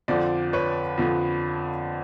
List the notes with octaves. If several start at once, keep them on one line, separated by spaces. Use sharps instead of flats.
F2 D3 F3 C5 D5
B4 C#5
F2 D3 F3